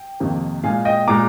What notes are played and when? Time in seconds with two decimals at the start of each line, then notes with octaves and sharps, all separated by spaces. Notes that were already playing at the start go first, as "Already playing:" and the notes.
Already playing: G5
0.20 F2 C3 D#3 A#3
0.64 A#2 G#3 F5 G#5
0.85 D#5 G5
1.08 A#2 G#3 A#5 D6